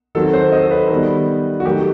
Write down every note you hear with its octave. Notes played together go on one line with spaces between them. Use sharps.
D#3 F#3 C4 A4
C5
D#5
A4
B4
D#3 G3 B3
F#4
D#3 F#3 A3 G4